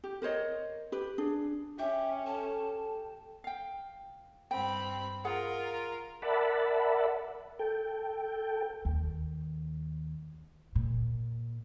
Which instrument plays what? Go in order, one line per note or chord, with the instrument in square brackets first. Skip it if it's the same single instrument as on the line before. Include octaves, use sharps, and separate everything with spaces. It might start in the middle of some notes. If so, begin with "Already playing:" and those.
[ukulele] G4
A#4 C5 C#5 D#5
G4 B4
D4 G#4
[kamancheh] C#4 [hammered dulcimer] G4 [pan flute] E5
[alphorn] A4 [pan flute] A5
[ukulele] F5 G5
[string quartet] G2 C4 B5 [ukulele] G5
[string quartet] F4 A#4 [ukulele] G#4 F#5
[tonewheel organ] A#4 D5 E5 F#5 A5 B5
A4 G5
[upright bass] D#2
A#2